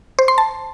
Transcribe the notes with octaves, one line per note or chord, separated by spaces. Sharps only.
C5
C6
A5